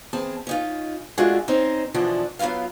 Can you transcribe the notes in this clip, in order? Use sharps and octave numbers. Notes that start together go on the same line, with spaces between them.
E2 C4 G#4 A5
C#4 D#4 F4
G#3 A3 D4 F4 F#4 G#4
C4 C#4 D#4 C5
E2 B2 D3 E3 F3 D4
F#3 B3 E4 F4 F5